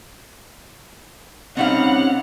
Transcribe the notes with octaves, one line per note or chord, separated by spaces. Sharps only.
B2 G3 C4 C#4 D#4 F5 F#5 F7